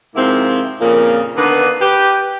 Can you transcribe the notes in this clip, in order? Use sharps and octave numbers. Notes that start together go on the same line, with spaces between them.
G#2 C3 F3 A#3 C4 E4
F2 A#2 C#3 F3 A#3
D3 D#3 A#3 B3 D4 B4
G4 B4